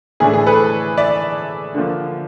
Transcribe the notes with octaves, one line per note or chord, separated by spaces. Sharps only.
A2 E3 A3 D4 G#4
G#4
A4 B4
D5 E5
D3 F3 A#3